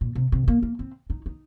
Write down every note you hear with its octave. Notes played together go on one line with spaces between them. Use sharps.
A#2
C3
C3
A#3
A#3
C4
D#4
D#4